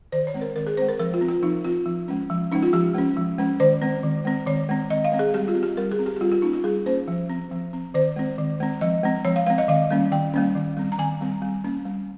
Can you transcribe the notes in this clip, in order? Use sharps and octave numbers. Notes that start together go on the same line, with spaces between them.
D#3 C5
C#5
G#3 C4
A#4
D#3 A#4
G#4
G#3 C4 C5
A#4
F3 A#4
F4
C4
F4
F3 D#4
C4 F4
F3
G#3 C#4
F3
G#3 C#4 D#4
F4
F3 G4
G#3 C#4
F3
G#3 C#4
D#3 C5
G#3 C4
D#3
G#3 C4
D#3 C#5
G#3 C4
D#3 D#5
F5
G#3 C4
G#4
G3 G4
F4
C4
G4
G3 A#4
G#4
C4
G4
G4
G3 F4
F4
A#3 C#4 D#4
F4
G3 G#4
A#3 C#4 C5
F3
C4
F3
C4
D#3 C5
G#3 C4
D#3
G#3 C4
F3 D#5
G#3 C4
F3 C#5
F5
G#3 C4 F5
D#5
D#3 F5
G3 A#3 C#4
D#3 G5
G3 A#3 C#4
D#3
G3 C4
A#5
D#3 G#5
G3 C4
G3
A#3 C#4
G3